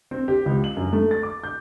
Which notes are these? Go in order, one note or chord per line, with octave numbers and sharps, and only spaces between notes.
C4
G4
C#2
F#7
F#2
A3
A6
D6
G6